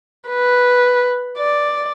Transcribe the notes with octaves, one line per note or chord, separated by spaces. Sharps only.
B4
D5